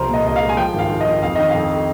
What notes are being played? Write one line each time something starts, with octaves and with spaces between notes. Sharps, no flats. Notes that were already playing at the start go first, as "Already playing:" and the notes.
Already playing: C2 F3 A#4 C5
A#2
D#5
C2 D#5
F5
G#3
G#5
F3 G5
G#1 F5
G#1
D#5
F3
F2 F5
D#3 D#5
F5
F2